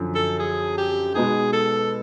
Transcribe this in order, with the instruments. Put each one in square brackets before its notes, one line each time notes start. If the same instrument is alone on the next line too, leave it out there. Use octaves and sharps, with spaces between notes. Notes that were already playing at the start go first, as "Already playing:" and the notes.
Already playing: [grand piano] F#2 D3 F3
[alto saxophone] A4
G#4
G4
[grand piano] B2 G#3 B3 D#4 [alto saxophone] G#4
[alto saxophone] A4